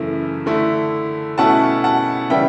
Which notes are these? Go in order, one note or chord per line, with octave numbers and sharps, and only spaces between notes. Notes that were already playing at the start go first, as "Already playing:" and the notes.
Already playing: F#2 C#3 E3 A3 E4
D3 A3 E4
B2 A3 C#4 E4 F#5 A5
F#5 A5
C#3 E3 G3 B3 E5 G5